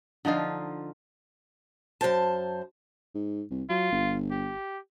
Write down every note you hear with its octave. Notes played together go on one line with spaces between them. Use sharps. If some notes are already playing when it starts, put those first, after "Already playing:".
D3 F3 D#4 F4
F#2 C3 C5 A5
G#2
C2
F#3 F4
G1
G4